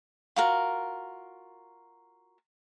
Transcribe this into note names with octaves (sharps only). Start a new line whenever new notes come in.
F4 F#4 A#4